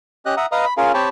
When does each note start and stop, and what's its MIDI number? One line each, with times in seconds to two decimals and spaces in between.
0.26 0.35 61
0.26 0.35 67
0.26 0.35 75
0.26 0.35 90
0.37 0.46 76
0.37 0.46 78
0.37 0.46 82
0.37 0.46 87
0.52 0.65 71
0.52 0.65 75
0.52 0.65 77
0.52 0.65 82
0.52 0.65 87
0.65 0.74 83
0.77 0.92 61
0.77 0.92 65
0.77 0.92 68
0.77 0.92 70
0.77 0.92 77
0.94 1.09 60
0.94 1.09 67
0.94 1.09 73
0.94 1.09 79
0.94 1.09 81
0.94 1.09 83